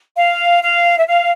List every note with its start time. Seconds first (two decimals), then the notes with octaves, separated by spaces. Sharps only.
0.17 F5
0.62 F5
0.99 E5
1.07 F5